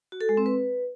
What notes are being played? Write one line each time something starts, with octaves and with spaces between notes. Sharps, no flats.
F#4
A4
G#3
C4
B4